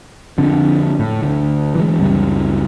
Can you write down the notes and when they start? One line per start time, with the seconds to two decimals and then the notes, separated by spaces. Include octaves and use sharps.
0.38 F2 D3
0.99 A2
1.23 D2
1.75 E3 G#3
1.99 C#2 F#2 G3